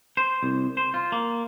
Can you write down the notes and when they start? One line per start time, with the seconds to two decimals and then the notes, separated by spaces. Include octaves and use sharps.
0.17 C5
0.43 C2
0.77 C5
0.94 F4
1.12 A#3